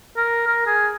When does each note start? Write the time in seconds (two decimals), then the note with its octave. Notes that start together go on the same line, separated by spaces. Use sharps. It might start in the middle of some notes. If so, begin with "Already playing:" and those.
0.17 A#4
0.47 A#4
0.67 G#4